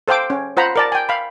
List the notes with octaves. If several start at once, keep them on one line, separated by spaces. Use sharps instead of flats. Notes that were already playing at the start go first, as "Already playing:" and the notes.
A4 C5 F5 G5 D6
C#4
F4 C5 F#5 A#5 B5
A#4 D5 A5
G5 G#5
F5 B5